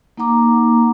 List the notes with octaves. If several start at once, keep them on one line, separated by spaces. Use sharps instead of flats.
A#3 D#4 F#5 A#5 D6